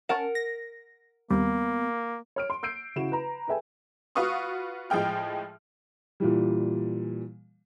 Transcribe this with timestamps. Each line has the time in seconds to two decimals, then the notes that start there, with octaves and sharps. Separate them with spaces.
0.09 C#4 A#4 F#5 A5
0.35 A#6
1.30 D#2 C3 G3 A#3 B3
2.36 C#5 F6 D7
2.50 C6
2.63 E6 G6 C7 D7
2.96 C#3 E4 F#4 E7
3.12 B4 A#5
3.48 G#4 A4 B4 E5 G5 G#5
4.15 F4 F#4 B4 F5 C#6 D#6
4.90 A2 F3 G#3 G#4 G5 F6
6.20 A#2 E3 G3